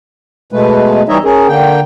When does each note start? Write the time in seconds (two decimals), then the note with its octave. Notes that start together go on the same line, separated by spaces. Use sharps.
0.52 B2 G#3 A3 B4
1.09 E3 G3 D#4 C#5 D#5 E5
1.24 C#4 G#4 A#4
1.48 D3 A#3 G5